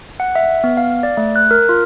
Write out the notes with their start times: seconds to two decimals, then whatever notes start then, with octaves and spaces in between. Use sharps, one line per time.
0.20 F#5
0.35 E5
0.64 B3
0.77 F5
1.03 D5
1.17 A3
1.36 F#6
1.51 A#4
1.69 F4